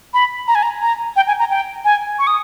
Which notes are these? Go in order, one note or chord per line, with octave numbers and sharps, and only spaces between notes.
B5
A#5
G#5
A#5
A#5
G5
G#5
A#5
G5
G#5
C#6
D#6